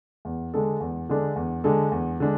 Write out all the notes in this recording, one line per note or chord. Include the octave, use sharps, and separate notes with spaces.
E2
D3 G#3 D4 A4
E2
D3 G#3 D4 A4
E2
D3 G#3 D4 A4
E2
D3 G#3 D4